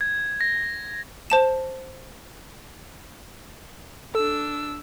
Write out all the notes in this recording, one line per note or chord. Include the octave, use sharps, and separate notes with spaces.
G#6
A#6
C5 A5 E7
D4 A4 E6